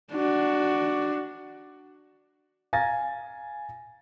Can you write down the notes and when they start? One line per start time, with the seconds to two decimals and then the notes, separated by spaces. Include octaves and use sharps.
0.12 D4 F#4
2.73 F5 G#5 A#5 A6 A#6